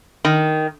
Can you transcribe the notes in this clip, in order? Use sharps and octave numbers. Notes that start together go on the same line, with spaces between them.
D#3